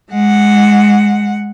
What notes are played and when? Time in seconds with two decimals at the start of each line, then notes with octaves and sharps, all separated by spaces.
0.10 G#3 F#5